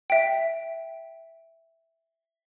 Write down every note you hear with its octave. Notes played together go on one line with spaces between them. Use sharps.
E5 G5